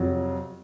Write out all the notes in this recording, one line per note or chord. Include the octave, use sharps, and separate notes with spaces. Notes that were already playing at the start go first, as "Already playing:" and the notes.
Already playing: F2 C3 F#3